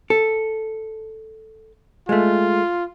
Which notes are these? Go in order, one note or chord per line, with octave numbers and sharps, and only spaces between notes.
A4
G#3 A3 F4